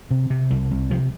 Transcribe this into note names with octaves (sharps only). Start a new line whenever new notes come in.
C3
C3
C2 G3
C2
C3 F3